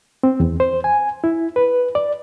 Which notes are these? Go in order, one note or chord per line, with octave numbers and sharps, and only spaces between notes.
C4
E2
C5
G#5
E4
B4
D5